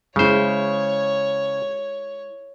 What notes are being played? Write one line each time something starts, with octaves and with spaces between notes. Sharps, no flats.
C#3 G#3 E4 C5 C#5